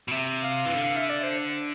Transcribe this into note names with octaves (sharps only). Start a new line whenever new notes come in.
B2
C3 E5
F5
E3
D3
F5
E5
D5
C5